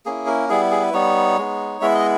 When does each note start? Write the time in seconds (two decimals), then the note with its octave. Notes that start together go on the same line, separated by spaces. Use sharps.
0.06 A#3 C#4 E4 G#4
0.27 A#4
0.49 G3 B3 E4 G#4
0.71 G#4
0.83 B4
0.94 G3 B3 D#4 C#5
1.38 G#3 B3 D#4
1.81 G#3 B3 E4 E5
1.95 D#5